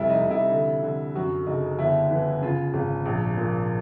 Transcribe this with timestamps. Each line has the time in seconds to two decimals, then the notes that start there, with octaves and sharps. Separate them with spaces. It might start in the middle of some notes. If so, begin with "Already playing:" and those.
Already playing: F1 G3 E4
0.10 D#4
0.20 F1
0.31 E4
0.52 D3
0.83 D3
1.15 F#2 F#4
1.47 F#1 D#4
1.78 G1 E4
2.11 E3
2.42 C#3 F4
2.74 G#1
3.06 A#1
3.37 A#2